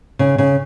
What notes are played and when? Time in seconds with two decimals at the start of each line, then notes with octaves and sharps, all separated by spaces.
0.19 C#3
0.38 C#3